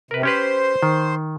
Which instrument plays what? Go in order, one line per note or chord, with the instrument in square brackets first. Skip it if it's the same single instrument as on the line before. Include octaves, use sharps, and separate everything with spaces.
[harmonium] C3 [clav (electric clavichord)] A#4 B4
[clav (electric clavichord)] C#4 G4 B4 [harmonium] C5
[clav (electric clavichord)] D#3